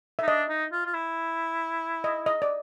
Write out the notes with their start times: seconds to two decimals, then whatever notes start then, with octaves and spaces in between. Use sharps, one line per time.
0.19 D#4 E5
0.28 D4 D#5
0.49 D#4
0.72 F4
0.86 F4
0.94 E4
2.04 D#5
2.26 D#5
2.42 D5